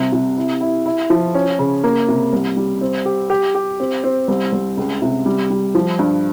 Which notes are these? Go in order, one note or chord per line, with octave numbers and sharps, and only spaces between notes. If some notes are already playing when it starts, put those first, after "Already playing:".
Already playing: C2 C3
C3
E4
E4
E4
F3
C#4
C#3
A#3
C3
C2
G3
C4
G4
G4
G4
C4
C4
C2
C2
C#2
C3
G3
G3
F3
G2